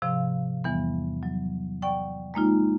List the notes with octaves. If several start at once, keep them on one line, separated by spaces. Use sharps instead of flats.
G#2 C3 F3 F5
E2 E3 G3 B3
F#3
D5 F#5 G5 C#6
G#3 A#3 D#4 F4